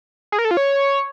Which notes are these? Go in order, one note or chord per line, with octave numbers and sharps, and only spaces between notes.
G#4
A#4
A4
F4
C#5